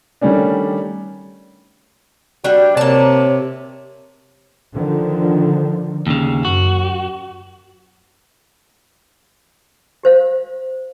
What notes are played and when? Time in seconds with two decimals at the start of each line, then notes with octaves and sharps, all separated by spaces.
0.21 D#3 G3 A3 C#4 D4
2.44 G3 D4 F#4
2.77 C3 A#3 C#5 A5
4.74 D3 D#3 F3
6.07 D#2 C#3
6.45 F#2 F#4
10.03 G4 C5 F5